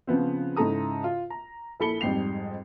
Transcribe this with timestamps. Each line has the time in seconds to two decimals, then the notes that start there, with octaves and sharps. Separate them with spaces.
0.07 C#3 F3 B3 C4
0.57 G#2 C#3 E4 A4 A#5 D#6
1.04 F4
1.30 A#5
1.80 A#1 E4 A4 B5 C#7 G7
2.01 F2 G#2 G3 G5 C7 F7